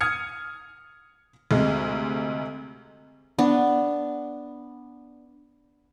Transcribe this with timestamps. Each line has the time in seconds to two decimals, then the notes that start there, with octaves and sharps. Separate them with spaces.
0.01 D#6 F6 G#6 C#7
1.51 D2 C3 G#3
3.39 B3 D4